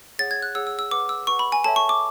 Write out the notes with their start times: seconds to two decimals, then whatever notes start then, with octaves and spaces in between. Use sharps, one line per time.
0.19 G#4 C#5 F#5 A6
0.31 G#6
0.42 F#6
0.55 G#4 C#5 F#5 E6
0.67 E6
0.79 E6
0.91 B4 F#5 D6
1.09 E6
1.27 B4 F#5 C#6
1.39 B5
1.52 G#5
1.64 A4 C#5 E5 A5
1.76 C#6
1.89 D6